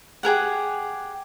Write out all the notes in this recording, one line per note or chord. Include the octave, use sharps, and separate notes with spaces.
G4 G#4 A#4 F#5